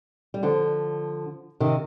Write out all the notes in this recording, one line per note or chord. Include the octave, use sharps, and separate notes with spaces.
G3
D3 F3
C3 D#3